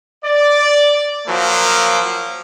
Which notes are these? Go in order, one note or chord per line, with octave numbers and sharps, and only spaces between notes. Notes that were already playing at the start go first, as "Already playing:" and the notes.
D5
F3 F#3 A#3